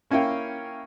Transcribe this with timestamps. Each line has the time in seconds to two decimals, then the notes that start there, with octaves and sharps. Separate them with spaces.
0.11 A#3 C#4 E4 F5 G5